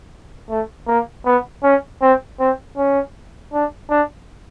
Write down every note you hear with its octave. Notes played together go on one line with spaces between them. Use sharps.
A3
A#3
B3
C#4
C4
C4
C#4
D4
D4